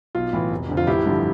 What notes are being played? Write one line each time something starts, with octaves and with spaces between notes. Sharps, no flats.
B1 F4
A2 E3
F1
F2 D3
F4
A1 E4 G4
G2 D3 F3